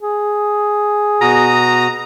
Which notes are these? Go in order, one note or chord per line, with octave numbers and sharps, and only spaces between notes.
G#4
B2 F#4 A#5 D#6